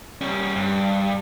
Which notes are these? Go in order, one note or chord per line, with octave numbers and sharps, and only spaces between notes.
G3 C#4
G2